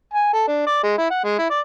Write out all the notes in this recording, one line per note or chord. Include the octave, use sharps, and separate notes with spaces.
G#5
A4
D4
D5
G#3
E4
F#5
G#3
E4
D5